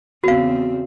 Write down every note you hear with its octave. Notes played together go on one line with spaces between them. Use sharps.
E2 C#3 C4 F#4 F5